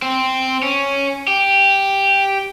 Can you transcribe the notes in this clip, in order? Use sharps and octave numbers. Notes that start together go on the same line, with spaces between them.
C4
C#4
G4